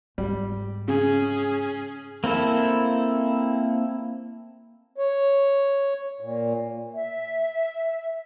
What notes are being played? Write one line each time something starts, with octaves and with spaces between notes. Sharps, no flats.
G#2 D3 G3
C#3 C#4 G#4
A#3 C4 E4 A4
C#5
A#2
E5